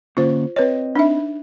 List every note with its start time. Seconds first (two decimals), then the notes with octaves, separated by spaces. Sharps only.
0.17 D3 A#3 C#4 F4 C5
0.56 C4 B4 C#5 D#5
0.95 D4 D#4 E5